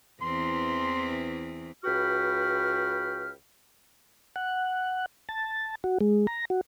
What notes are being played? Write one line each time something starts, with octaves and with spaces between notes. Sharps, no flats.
E2 E3 C4 C6
C#2 F#4 B4 G5 B5 F6
F#5
A5
F#4
G#3
A#5
F#4